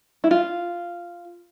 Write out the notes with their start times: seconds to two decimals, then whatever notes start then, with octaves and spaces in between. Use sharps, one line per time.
0.24 E4
0.31 F4